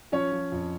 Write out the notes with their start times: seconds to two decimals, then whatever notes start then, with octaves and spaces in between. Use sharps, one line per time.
0.12 F3 C#4 C#5
0.32 F3
0.52 F2